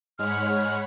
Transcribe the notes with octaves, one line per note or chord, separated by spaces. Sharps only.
G#2 G#3 C#5 F#5 B5 F6